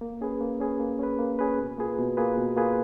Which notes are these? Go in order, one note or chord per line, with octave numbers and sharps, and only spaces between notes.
A#3
C#4 G#4 B4
A#3
C#4 G#4 B4
A#3
C#4 G#4 B4
A#3
C#4 G#4 B4
B2
A#3 F4 G#4 B4
B2
A#3 F4 G#4 B4
B2
A#3 F4 G#4 B4